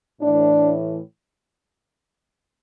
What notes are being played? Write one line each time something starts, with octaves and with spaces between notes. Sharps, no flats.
A2 E3 D4